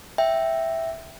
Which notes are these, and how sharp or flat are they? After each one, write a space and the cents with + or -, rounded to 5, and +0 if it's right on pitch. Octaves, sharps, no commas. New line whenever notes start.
E5 +0 G5 -5